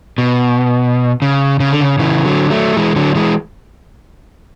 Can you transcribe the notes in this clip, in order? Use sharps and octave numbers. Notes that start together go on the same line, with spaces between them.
B2
C#3
C#3
D3
C#3
C#3 E3
D3 F#3
F#3 A3
E3 G#3
D3 F#3
E3 G#3